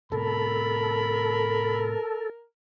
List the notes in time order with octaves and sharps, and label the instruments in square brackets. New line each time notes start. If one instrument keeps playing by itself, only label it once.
[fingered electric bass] A2 C3 [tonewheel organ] A4 [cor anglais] A#4 [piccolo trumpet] B5